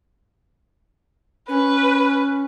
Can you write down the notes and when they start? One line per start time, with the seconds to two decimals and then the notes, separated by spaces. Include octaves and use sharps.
1.49 C#4 B4